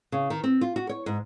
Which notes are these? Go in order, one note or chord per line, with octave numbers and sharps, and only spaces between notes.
C#3
D#3
C4
F4
F#4
C#5
G#2